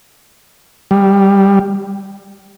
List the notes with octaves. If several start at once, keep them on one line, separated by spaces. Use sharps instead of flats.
G3